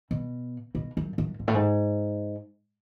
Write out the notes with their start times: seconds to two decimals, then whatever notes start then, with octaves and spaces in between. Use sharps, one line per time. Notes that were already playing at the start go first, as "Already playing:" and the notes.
0.11 B2
0.75 B2
0.97 F#2
1.18 F#2
1.39 G#2
1.48 A2
1.55 G#2